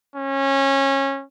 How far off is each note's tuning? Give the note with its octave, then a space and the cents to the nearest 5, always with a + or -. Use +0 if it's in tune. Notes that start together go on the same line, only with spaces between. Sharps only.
C#4 -20